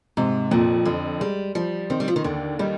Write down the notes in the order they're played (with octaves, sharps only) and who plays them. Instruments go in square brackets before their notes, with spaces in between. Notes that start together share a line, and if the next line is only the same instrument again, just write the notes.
[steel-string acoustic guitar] G#2 [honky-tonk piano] C3
[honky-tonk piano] F2 [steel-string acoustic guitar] A#2
[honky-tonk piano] F2 [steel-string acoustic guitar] D3
[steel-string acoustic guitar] G3 [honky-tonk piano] G#3
[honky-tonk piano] F3 [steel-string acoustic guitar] G3
[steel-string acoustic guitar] D#3 [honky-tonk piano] C4
[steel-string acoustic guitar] G3
F3
D#3
[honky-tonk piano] D#2 [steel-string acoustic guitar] D3
[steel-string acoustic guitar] D#3 [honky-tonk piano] G3